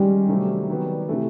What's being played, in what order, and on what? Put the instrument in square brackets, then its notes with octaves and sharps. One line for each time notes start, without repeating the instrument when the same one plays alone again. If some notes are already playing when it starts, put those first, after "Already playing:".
Already playing: [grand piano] D#3 G#3 C#4 [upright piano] G3
[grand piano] C3 D#3 F#3 A3 C4
D#3 F#3 B3
C3 E3 A3